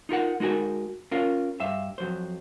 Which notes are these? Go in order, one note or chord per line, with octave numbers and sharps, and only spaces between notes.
D#4 F4 A#4 F#5
G#3 D#4 F#4 A#4 G#5
C#4 F4 A#4 F5
G2 E5 F5
F2 F#3 C5